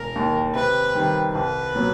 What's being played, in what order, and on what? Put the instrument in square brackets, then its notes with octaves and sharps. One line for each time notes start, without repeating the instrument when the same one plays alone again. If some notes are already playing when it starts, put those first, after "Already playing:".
Already playing: [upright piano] E1 [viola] A#4
[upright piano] D#2 D#3
[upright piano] C3 [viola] B4
[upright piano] D#3 G3
[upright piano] C2 [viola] B4
[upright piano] A#2 F#3 B3